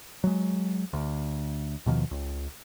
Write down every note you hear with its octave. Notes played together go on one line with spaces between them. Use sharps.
F#3 G#3
D2
D#2 B2 D#3 F3
C#2